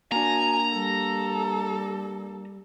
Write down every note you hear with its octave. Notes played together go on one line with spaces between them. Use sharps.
A#3 D4 F#4 G#5 A#5
G3 A4